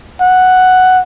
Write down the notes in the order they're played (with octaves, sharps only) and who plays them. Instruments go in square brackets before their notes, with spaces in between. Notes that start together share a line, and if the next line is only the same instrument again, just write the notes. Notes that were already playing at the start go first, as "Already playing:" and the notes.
[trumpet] F#5